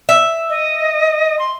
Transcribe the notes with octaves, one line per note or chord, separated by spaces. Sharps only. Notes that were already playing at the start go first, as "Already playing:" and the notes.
E5
D#5
C6